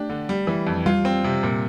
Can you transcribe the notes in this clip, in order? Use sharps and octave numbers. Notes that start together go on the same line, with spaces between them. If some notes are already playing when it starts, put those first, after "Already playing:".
Already playing: A3 D4 G4
D3
G3
E3
F2
G3 F4
C4
C3
A#2